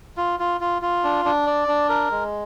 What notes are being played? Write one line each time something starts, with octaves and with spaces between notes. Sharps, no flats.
F4
F4
F4
F4
D4
D4
D5
D4
A#4
G#3